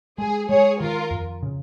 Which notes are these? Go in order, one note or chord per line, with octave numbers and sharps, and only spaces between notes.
G#3 G#4
G#3 G#4 C#5
D#3 F4 A#4
F2
C#3